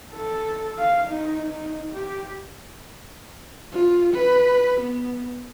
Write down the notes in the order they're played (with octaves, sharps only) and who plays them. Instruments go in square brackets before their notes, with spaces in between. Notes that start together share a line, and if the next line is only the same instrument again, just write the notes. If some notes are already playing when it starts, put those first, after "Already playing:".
[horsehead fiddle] A4
F5
D#4
D#4
G4
F4
B4
B3